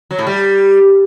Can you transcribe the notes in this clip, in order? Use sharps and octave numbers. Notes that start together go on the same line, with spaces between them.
F#3
A2
G3